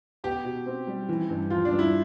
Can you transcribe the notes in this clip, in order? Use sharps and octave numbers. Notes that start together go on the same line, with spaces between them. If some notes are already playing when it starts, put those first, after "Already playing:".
B3 G4
B2
C4
G3
E3
G2
F3 F4
D4
G2
E4